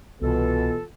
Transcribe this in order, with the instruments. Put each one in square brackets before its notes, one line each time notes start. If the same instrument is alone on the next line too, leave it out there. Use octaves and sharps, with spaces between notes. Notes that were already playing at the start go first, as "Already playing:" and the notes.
[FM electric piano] C2 [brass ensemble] B2 [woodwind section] E3 F4 A4